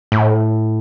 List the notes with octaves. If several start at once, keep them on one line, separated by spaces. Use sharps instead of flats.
A2